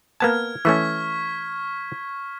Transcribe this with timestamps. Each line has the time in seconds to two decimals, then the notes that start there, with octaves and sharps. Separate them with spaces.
0.20 A#3 B3 A5 F6 G#6
0.65 E3 A3 C#4 C#6 B6